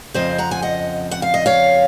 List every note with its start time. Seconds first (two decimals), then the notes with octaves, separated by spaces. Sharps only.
0.14 F2 C#3 F3 C4 C5 D#5
0.38 F#5 A#5
0.51 G#5
0.62 D#5 F#5
1.11 F#5
1.22 F5
1.34 D#5
1.46 C#5 F5